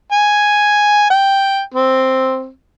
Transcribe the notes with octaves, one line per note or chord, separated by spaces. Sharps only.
G#5
G5
C4